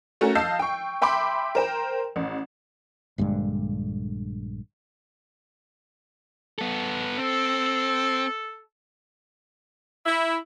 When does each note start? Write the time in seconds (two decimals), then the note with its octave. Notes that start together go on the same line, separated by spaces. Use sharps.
0.21 A3 C#4 F#4 A#4
0.35 D#5 F5 A5 E6 G6 C7
0.59 G5 C#6
1.02 E5 G5 B5 C6 D6
1.55 A#4 C5 G5
2.16 A1
3.18 A#1 G2 D3 G#3
6.59 B3 A4
7.18 C4 A4
10.06 E4